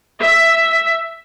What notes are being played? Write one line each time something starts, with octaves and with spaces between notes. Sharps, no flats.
E5